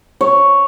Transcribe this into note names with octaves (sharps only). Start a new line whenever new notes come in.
C#5